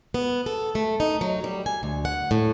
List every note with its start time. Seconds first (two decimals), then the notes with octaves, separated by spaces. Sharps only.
0.14 B3
0.46 A4
0.75 A3
1.00 D#4
1.21 F#3
1.44 G3
1.66 G#5
1.83 D2
2.05 F#5
2.31 A2